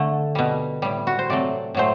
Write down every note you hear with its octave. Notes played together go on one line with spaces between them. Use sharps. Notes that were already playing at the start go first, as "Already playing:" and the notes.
Already playing: D3 A3
B2 G3
A2 G3
F#4
C5
C3 F#3 A3 D5
A2 F#3 A3 C5